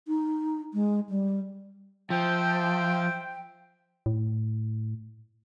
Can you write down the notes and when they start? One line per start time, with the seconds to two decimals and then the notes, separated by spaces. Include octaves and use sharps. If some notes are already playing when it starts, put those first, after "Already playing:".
0.08 D#4
0.74 G#3
1.09 G3
2.10 F3 C5 E5 G5
4.06 A2